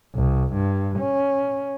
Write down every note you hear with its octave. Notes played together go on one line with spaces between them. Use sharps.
C2
G2
C#4